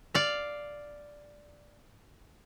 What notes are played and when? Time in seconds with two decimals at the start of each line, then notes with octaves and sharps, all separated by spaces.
0.14 D5 F5